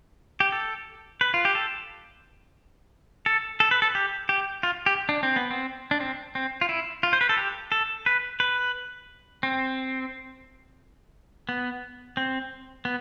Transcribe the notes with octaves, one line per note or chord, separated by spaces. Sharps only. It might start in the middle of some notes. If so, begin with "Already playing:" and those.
G4
A4
B4
F4
G4
A4
A4
A4
B4
A4
G4
G4
F4
G4
D4
C4
B3
C4
D4
C4
C4
F4
E4
F4
C5
B4
A4
G4
A4
B4
B4
C4
B3
C4
B3